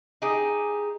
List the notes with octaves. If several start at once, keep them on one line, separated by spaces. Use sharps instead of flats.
D#4 G4 G#4